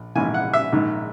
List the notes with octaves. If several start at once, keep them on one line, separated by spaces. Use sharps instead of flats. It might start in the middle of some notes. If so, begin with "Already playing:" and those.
Already playing: A#1
A#1 G#2 E3 G#5
F#5
E5
A#1 G#2 D#3